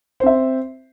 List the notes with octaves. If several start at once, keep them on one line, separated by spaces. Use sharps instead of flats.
C4 C5 E5